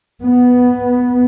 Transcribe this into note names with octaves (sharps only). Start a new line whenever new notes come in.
B3